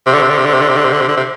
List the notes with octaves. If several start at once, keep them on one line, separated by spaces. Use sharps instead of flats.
C3
D3
C3
D3
C3
D3
C3
D3
C3
D3
C3
D3
C3
D3
C3